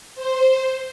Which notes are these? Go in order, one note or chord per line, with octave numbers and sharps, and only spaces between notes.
C5